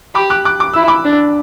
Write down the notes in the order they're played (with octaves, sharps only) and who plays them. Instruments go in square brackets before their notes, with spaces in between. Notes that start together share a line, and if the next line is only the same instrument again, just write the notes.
[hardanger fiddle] G4 [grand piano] B5 D6
[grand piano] D6 F#6
D6 F#6
D6
[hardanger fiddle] E4 [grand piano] E6
[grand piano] B5 D6
[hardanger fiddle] D4